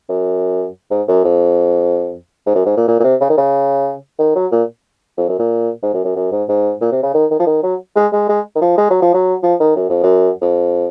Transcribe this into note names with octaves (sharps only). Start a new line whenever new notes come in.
F#2
G#2
F#2
F2
G#2
F#2
G#2
A#2
A#2
A#2
C3
C#3
D#3
C#3
D#3
F#3
A#2
F2
F#2
A#2
G#2
F#2
F#2
F#2
G#2
G#2
A#2
C3
C#3
D#3
D#3
F3
D#3
F#3
G#3
G#3
G#3
D#3
F3
G#3
F#3
F3
F#3
F3
D#3
F#2
F2
F#2
F2